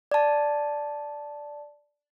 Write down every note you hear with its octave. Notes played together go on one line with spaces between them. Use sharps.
D5 A5